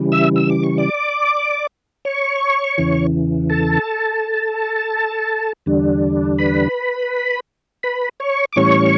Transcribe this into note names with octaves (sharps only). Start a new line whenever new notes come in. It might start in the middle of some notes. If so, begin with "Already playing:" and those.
Already playing: C#3 E3 G3
E5 E6
E6
D6
C#6
D5 D6
C#5 C#6
E2 C#3 E3
A4 A5
E2 D3 G3 D4
B4 B5
B4 B5
C#5 C#6
D6
A2 E3 G3 C#4 C#5 C#6